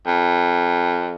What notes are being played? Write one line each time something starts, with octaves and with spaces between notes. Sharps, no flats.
F2